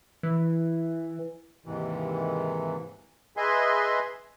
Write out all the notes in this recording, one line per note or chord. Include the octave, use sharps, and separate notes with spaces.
E3
D#2 G#2 C3 E3
G#4 B4 D#5 E5 G#5 C6